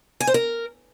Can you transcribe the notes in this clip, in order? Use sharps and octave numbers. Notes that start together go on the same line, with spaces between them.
G#5
C5
A#4